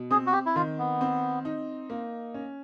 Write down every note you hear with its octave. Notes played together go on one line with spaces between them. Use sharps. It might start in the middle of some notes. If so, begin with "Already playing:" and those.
Already playing: B2
C4 G#4
F#4
G4
E4
D#3 F4
B3
C4
D#4
A#3
C#4